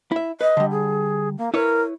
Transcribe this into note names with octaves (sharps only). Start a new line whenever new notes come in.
E4 E5
B4 D#5
D3 G3
G#4
A#3
E4 A#4 B4 C#5